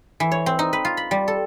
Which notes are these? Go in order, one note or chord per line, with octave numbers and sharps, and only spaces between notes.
E3
C#5
C4
D#4
B4
F4
B5
G3
A4